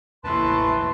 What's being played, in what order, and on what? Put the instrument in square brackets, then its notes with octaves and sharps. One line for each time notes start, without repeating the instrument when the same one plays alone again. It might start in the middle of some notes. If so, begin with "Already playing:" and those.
[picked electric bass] E1 A1 [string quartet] D#2 E3 A3 [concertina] B4 A5 [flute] C6